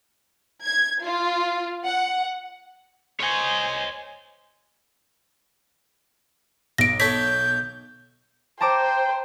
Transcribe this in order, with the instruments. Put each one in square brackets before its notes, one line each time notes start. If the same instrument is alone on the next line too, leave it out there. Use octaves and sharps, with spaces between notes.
[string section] G#6
F4
F#5
[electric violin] C5 G#5 [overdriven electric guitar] C#5 D#5
[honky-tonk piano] B1 [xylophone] A#6 D7
[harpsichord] A4 C#5 [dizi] G6 [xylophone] B6
[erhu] C5 [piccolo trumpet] G5 [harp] A5 A#5 D6